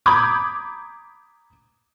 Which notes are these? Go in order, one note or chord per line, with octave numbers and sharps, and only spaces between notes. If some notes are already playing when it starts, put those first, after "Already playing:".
A#5 B5 D6 D#6 G6 G#6